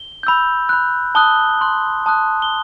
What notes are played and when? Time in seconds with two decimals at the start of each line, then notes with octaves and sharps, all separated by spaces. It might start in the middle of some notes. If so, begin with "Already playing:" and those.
Already playing: G7
0.23 B5 E6 G6
0.69 B5 F#6
1.15 A5 D#6 F#6 G7
1.61 C6 F#6
2.06 A5 D#6 F#6
2.42 G7